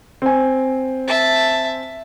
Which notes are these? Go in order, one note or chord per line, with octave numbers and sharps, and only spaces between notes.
C4 G#5
E5 A5